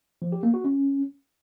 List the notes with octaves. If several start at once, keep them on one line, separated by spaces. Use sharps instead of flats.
F3
G4
A#3
F#4
C#4